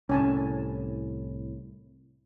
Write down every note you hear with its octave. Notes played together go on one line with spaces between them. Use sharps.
C2 A2 C#4 G#5 A5